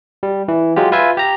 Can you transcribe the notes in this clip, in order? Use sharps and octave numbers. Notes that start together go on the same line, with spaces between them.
G3
E3
F#3 G#3 F4 G4
F4 B4 E5 G#5
G4 A#5